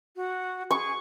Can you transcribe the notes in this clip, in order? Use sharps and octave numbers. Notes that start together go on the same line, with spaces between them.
F#4
G#4 C#6